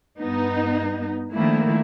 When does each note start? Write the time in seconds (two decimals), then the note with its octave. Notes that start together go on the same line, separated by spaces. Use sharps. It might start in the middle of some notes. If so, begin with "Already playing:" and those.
0.20 G2 B3 D#4
1.33 D3 D#3 F3 A3 A#3 E4